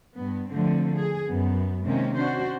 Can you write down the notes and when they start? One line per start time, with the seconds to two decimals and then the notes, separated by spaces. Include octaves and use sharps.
0.18 G2 B3
0.51 D3 F3 A3 C4
0.95 G#4
1.27 F#2 B3
1.85 C3 D#3 G#3 A#3 C4 C#4
2.17 C#4 D4 F#4 C5